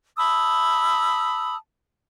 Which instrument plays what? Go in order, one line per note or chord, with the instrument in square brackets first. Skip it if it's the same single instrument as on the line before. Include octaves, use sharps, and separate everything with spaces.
[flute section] A5 B5 D#6 E6